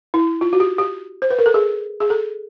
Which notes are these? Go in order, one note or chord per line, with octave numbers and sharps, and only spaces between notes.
E4
F4
F#4
G4
G4
C5
B4
A#4
A4
G#4
G#4
A4